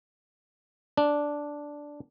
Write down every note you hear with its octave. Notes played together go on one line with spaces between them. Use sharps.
D4